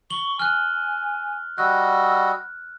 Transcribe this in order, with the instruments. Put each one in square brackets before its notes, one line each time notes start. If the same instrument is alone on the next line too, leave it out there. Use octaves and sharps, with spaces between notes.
[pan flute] C#6 [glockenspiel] F#7 G7
[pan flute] G#5 [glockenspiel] F6 F#6
[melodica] G3 F#4 D#5 [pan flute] E6 [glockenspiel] F#6